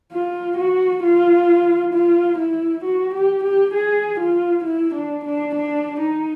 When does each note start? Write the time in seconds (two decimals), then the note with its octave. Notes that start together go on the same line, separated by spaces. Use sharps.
0.12 F4
0.58 F#4
1.03 F4
1.93 F4
2.39 E4
2.84 F#4
3.14 G4
3.44 G4
3.74 G#4
4.20 F4
4.64 E4
4.94 D4
5.25 D4
5.55 D4
6.00 D#4